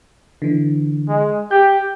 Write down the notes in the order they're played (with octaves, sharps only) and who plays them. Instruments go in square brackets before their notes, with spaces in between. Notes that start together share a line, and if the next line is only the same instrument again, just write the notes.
[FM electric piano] D3 E3
[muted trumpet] G#3
[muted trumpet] G4 [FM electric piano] G6